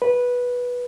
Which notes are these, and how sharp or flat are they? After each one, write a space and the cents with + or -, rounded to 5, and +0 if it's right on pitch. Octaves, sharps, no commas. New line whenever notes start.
B4 -10